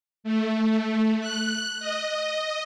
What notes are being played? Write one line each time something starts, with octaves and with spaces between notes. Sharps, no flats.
A3
F#6
D#5